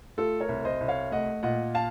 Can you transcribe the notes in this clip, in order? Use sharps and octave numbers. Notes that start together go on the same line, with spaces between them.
A3 F4 A4
A#4 C#5
C2
C5 D#5
C2
C#5 F5
A3 D#5 F#5
A#2 D#5 F#5
F5 A5